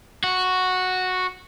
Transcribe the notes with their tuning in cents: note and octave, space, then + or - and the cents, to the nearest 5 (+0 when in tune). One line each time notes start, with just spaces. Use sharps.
F#4 -5